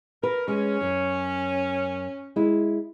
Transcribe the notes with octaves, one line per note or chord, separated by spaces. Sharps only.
A#4 B4
G#3 C#4
F#2
G#3 E4